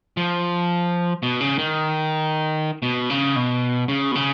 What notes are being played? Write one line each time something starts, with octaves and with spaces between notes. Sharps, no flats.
F3
B2
C#3
D#3
B2
C#3
B2
C#3
B2
C#3